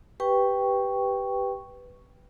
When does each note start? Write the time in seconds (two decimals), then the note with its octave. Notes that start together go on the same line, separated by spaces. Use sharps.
0.20 G4 B4 G5 C#6